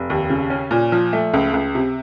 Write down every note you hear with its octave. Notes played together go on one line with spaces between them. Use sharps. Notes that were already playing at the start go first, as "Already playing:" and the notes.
Already playing: F1
D#2
C#3
C#4
A#2
F3
A3
C#2
C#2
C3